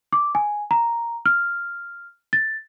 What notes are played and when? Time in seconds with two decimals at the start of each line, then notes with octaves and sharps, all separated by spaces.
0.13 D6
0.35 G#5
0.71 A#5
1.26 F6
2.33 A6